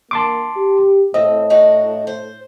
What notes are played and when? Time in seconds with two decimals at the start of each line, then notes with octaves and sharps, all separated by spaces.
0.11 A#3 A5 C6 D6
0.56 G4
1.14 A2 C4 D#5
1.50 D4 D#4 F#4
2.07 C5